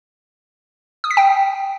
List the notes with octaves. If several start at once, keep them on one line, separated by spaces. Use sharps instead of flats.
D#6
B6
G5